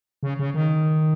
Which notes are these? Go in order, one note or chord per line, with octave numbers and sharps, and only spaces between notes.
C#3
C#3
D#3